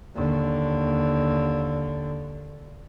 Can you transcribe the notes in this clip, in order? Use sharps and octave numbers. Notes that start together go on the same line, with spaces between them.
D#2 D3